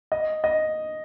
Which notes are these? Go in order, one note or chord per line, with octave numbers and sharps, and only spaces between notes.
D#5
D#5